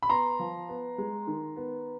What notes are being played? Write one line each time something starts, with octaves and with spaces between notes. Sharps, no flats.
B5
B3 A#5 C6
F3
B3
G#3
D#3
B3